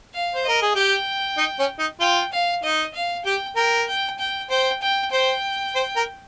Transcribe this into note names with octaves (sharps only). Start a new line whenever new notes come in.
F5
C5
A#4 D#5
G#4
G4 G5
D#4
C#4
D#4
F4 G5
F5
D#4 D#5
F5
G4 G5
A#4 G5
G5
G5
C5 G5
G5
C5 G5
C5
A#4